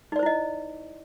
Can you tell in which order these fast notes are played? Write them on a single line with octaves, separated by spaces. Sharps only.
D#4 D5 C5 E4 D#5